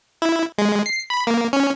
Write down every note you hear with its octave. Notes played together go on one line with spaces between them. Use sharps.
E4
G#3
C7
B5
A#3
C#4